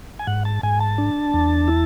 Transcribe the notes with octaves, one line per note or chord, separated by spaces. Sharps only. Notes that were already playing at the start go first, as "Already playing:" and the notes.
G#5
G#2 F#5
A5
G#2 G#5
A5
D4
E2
E4